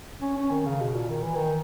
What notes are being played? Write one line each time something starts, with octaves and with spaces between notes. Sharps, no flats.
C#4
C#4
D#3
C#3
B2
A#2
D#3
E3
D#3